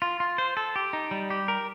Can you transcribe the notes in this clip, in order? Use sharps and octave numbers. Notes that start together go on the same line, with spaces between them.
F4
F4
C5
A4
G4
D#4
G3
G4
A#4